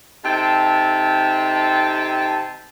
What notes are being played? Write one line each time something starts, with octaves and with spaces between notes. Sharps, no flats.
C3 D#4 A4 G5 A5